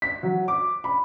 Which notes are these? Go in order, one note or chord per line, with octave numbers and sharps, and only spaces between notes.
B6
F#3
D6
B5